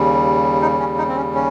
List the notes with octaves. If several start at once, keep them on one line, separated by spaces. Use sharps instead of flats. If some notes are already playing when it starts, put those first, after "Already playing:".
Already playing: D#2 C#3 G3
D#4
C#4
D#4
C4
C#4
C#4